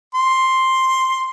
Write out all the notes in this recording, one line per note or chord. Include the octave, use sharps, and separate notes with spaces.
C6